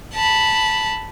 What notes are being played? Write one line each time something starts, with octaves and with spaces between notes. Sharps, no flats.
A5 B5